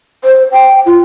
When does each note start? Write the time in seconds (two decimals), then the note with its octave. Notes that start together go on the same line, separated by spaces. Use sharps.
0.24 C5
0.52 G5
0.86 F4